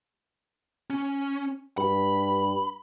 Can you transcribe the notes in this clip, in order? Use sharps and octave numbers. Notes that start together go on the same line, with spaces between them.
C#4
G2 B5